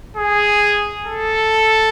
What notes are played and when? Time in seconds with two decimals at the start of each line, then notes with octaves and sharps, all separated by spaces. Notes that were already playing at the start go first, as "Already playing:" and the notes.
0.17 G#4
1.06 A4